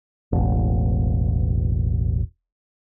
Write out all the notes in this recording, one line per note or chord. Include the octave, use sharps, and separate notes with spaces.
E1 A1